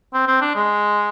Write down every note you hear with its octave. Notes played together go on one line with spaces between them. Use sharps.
C4
C4
D4
G#3